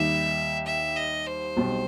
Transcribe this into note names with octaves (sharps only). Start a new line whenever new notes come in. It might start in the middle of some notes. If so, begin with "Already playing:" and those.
Already playing: D#2 D#3 G3 D#4 G4 E5
E5
D#5
C5
B1 B2 G3 C4